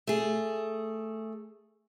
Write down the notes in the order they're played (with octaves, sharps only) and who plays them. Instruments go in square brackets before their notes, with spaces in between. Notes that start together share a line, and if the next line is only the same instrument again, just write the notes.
[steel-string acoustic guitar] A3 G#4